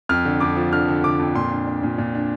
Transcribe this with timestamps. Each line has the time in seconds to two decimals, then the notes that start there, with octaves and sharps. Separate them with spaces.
0.09 F2 F6
0.25 D3
0.40 F2 D6
0.56 F3
0.73 D3 F6
0.88 D3
1.04 D3 D6
1.19 F2
1.35 A#2 C6
1.51 D4
1.67 D4
1.83 A#2
1.98 A#2
2.15 D4